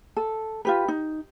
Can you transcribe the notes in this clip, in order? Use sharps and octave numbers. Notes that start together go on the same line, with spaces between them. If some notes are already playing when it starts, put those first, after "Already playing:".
A4
F4 G4 B4
D#4